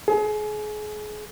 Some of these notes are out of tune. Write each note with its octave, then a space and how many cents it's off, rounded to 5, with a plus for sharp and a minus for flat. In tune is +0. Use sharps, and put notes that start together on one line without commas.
G#4 +30